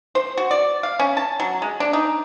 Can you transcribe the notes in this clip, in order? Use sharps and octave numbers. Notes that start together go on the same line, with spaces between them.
C5
F#4
D5
F5
C#4
A5
F#3
G#3
D4
D#4